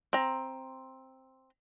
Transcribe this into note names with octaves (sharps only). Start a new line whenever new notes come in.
C4 A#5